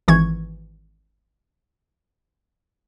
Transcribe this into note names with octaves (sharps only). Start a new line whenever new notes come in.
G#1 E3 C#6 G#6